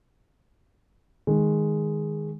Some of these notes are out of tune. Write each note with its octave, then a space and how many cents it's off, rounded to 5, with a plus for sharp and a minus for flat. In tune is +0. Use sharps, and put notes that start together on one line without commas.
D#3 +0 G#3 +0